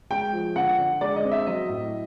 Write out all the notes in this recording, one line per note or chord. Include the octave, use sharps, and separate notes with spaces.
G#3 G5
F3
D3 F#5
D3
G#3 D5
D#5
C4
E5
F#3 D#5
A2